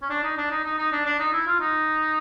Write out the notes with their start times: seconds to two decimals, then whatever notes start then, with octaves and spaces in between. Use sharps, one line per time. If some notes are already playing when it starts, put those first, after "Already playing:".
0.02 C#4
0.09 D4
0.23 D#4
0.37 D4
0.51 D#4
0.64 D#4
0.78 D#4
0.92 D4
1.06 D4
1.20 D#4
1.33 E4
1.47 F4
1.60 D#4